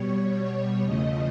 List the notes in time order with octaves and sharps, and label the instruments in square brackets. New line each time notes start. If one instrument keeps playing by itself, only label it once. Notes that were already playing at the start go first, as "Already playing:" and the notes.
Already playing: [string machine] B2 G3 C#5
C#5
E2 C#3 F3 A3 D#5